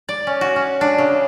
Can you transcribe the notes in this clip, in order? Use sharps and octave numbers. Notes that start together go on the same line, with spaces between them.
D5
C#4
F#4
C#4
D4
C#3